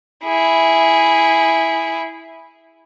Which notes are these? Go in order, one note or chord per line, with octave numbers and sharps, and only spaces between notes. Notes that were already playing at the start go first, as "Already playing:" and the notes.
E4 G#4